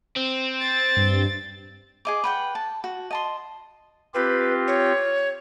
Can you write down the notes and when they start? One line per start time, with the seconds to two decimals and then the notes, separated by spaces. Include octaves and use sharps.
0.16 C4
0.61 A6
0.97 G2
2.05 G#4 D#5 D6
2.24 B4 F#5 G5
2.55 A5
2.84 F#4
3.11 D#5 A5 C6
4.14 C4 F4 G4 B4
4.68 C#5